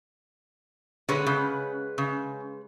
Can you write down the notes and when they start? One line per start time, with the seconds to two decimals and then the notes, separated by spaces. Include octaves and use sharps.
1.09 D3 G#3 B4 C#5 F#5
1.26 C#3
1.98 C#3